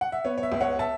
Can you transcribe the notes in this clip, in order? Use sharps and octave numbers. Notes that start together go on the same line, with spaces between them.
F#5
E5
B3 C#5
C#5
E5
C#2
C#5 F#5
E5 A5